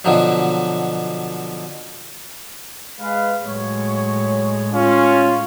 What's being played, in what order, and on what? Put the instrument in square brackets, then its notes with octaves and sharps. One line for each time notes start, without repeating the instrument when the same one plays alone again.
[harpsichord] B2 D3 F3 F#3
[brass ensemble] G#3 B4 F5
[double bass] A2 G#3 [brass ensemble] F#3 C#5
[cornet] C#4 [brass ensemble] F4